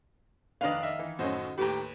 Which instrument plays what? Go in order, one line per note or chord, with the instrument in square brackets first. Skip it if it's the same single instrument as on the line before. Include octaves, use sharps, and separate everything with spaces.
[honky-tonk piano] F1 D4 [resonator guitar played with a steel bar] D#3 F5 [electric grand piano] B4
[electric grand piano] D#5 E5
[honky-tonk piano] E3
[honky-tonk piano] F#2 A2 C#4 [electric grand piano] F#4 C5 D#5
[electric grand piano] D#2 B4 B5 [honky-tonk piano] A2 A#5 [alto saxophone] G4